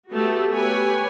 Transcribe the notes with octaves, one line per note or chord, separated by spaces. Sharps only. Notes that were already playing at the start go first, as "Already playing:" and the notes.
A3 B3 F#4 G4 A4
G4 B4 C#5 G#5